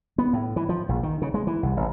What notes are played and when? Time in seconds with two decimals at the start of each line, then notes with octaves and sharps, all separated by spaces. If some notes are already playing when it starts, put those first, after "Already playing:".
0.18 B3
0.33 A2
0.56 E3
0.69 F3
0.89 A#1
1.03 D#3
1.22 C#3
1.34 G#3
1.47 E3
1.63 C2
1.77 A1